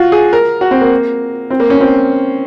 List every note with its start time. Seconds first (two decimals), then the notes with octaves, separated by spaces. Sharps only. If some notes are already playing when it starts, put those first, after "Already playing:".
Already playing: F4 F#4
0.12 G#4
0.33 A#4
0.61 F#4
0.71 C4
0.81 A#3
1.50 C4
1.60 A#3
1.70 C#4
1.80 C4